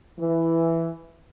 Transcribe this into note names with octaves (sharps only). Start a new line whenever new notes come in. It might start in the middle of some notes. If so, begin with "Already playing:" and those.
E3